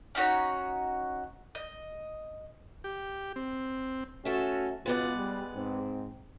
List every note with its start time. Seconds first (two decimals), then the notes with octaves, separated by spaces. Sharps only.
0.15 C#4 D#4 F#4 C#5
1.55 D#5
2.84 G4
3.36 C4
4.25 A3 C#4 F#4 A4 E5
4.86 C#2 B2 G#3 B3 F4 D5
5.17 G3
5.56 G#2 C4